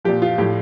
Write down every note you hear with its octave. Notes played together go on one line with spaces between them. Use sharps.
A#2 F3 G4
F4
A2 F3 G4